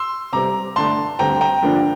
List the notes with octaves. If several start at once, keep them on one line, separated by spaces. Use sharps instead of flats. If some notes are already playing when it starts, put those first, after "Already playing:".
Already playing: C6 E6
C3 G3 C4 A#5 D6
G2 D3 A3 D4 A5 C6
D2 D3 G3 C4 G5 A#5
G5 A#5
G2 D3 F3 A#3 D4